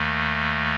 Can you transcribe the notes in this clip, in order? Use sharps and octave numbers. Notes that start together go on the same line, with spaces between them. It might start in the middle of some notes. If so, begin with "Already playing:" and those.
Already playing: D#2 D#3 A3